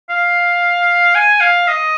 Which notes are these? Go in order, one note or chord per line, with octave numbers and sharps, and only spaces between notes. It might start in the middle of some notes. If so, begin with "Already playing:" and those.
F5
G#5
F5
D#5